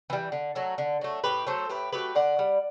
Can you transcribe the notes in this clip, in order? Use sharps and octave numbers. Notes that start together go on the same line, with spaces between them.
E3 G3
D3
F#3 A3
D3
F#3 A3
A2 G4 B4
F#3 A3 A4 C5
A2 G4 B4
F#3 A3 G4 B4
D3 D5 F#5
G3